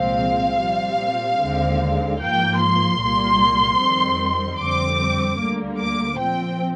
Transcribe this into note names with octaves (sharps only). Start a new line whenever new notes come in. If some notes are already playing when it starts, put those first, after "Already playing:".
Already playing: C2 A#2 F3 G#3 C4 F5
A#2 G3 C4
D#2 D3 G#3 C4
G#2 F3 A#3 G5
C6
C2 A#2 G3 A#3
F2 D#3 G3 C4
F2 D3 G3 C4 D6
D2 D3 G3 A#3
D6
A#2 F3 C4 G5